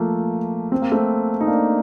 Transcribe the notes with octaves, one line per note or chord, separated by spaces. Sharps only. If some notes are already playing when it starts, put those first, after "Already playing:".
Already playing: F3 A3 A#3
C4
A#3
A3 C4
D#4
A#3 D4